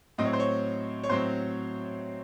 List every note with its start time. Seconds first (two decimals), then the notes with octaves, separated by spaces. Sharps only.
0.18 A2 F#3 C4 D#5
0.25 C#5
0.33 C5
0.40 C#5
1.03 C#5
1.09 A2 F#3 C4 C5